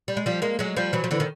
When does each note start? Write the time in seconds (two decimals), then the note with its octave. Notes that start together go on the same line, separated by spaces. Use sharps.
0.08 G3
0.17 G#3
0.26 F3 G3
0.42 G#3 A#3
0.59 F#3 G#3
0.77 F3 G3
0.93 E3 F#3
1.04 F3
1.11 D3 E3
1.20 D#3